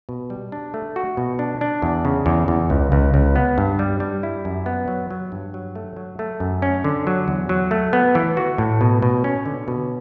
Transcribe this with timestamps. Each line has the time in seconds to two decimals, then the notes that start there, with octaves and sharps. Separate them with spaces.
0.09 B2
0.30 G3
0.52 D4
0.74 A3
0.96 F#4
1.17 B2
1.39 D4
1.61 D4
1.82 E2
2.05 C#3
2.26 E2
2.48 E2
2.70 C#2
2.92 C#2
3.14 C#2
3.35 B3
3.58 G2
3.79 G3
4.00 G3
4.23 E4
4.45 F#2
4.66 B3
4.88 F#3
5.10 F#3
5.32 G2
5.54 F#3
5.75 A3
5.97 F#3
6.19 A3
6.40 F#2
6.62 C#4
6.84 D3
7.07 F#3
7.28 E2
7.49 F#3
7.71 A3
7.93 B3
8.15 E3
8.37 F#4
8.58 A2
8.81 B2
9.02 B2
9.24 C#4
9.46 D3
9.68 B2